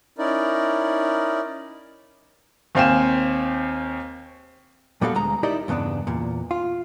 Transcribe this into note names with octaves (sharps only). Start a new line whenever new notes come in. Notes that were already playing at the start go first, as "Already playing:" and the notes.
C#4 D#4 E4 A#4 D5
D#2 C4 F5 G5 G#5 E7
A#2 G3 B3 F#4 A4 F5
D2 G#3 A#5
D#4 E4 G4 A#4 D5 D#5
E2 G2 C#3 B3 D4
E2 A#2
F4